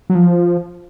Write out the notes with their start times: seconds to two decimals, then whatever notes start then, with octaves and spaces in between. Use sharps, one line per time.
0.10 F#3
0.15 F3